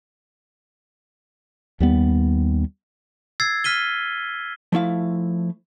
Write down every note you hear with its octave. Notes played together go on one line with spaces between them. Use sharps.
D#2 G3 B3
E6 G#6 A6 C7
F6 B6 D#7 G7
F3 A3 E4 F5